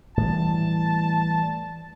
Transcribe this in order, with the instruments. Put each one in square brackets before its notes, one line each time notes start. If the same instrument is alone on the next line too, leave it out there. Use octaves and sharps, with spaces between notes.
[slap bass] A2 E3 G3 [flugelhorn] A5